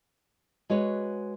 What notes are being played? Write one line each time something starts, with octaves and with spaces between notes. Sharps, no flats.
G#3 F#4 B4 C#5